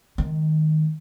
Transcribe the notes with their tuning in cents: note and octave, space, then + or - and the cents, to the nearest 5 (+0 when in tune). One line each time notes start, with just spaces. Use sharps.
D#3 +0 G#3 +20